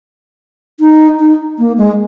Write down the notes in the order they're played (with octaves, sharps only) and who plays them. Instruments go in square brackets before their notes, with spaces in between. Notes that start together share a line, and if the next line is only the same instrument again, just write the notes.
[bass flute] D#4
D#4
A#3
G#3